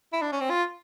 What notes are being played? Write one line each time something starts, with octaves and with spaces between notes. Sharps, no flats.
E4
D4
C#4
C4
F4